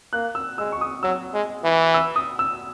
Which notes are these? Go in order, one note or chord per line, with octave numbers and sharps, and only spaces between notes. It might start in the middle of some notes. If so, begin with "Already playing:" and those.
A#3 F#6
E6
G#3 E6
C#6
D#6
F#3 E6
G#3
E3
E6
D#6
E6